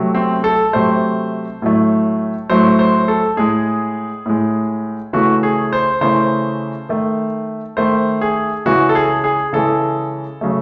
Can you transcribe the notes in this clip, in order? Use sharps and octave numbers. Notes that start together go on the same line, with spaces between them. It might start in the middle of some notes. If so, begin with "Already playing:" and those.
Already playing: C3 F#3 A3
C4
A4
C3 F#3 A3 C5
A2 F#3 A3
A2 F#3 A3 C5
C5
A4
A2 G#3 G#4
A2 G#3
C#3 E3 A3 F#4
G#4
C5
C#3 E3 A3 C5
D#3 A3
D#3 A3 C5
G#4
C#3 E3 G#3 F#4
A4
G#4
G#4
C#3 E3 G#3 A4
C#3 F#3 A3